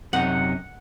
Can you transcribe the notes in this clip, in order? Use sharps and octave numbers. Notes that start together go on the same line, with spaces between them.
F#2 C3 D#4 F#5